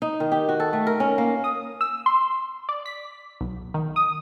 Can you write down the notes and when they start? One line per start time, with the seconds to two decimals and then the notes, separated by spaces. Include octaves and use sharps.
0.02 D#4
0.20 D#3
0.32 G4
0.49 F#4
0.60 A4
0.73 A3
0.87 A#4
1.00 C#4
1.18 A#3
1.44 D#6
1.81 E6
2.06 C6
2.69 D5
2.86 B6
3.41 B1
3.74 D#3
3.96 D#6